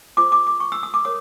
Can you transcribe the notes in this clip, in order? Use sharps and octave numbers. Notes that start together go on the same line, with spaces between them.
F4 G#4 C5 D6
D6
D6
C#6
E6
D#6
D6
A#4 C#5 D#6